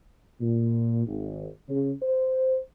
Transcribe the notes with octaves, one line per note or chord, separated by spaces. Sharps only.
A#2
G#1
C#3
C5